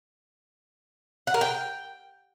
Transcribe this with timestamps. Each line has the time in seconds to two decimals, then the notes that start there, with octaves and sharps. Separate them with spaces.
1.27 F#5
1.34 A#4
1.41 G5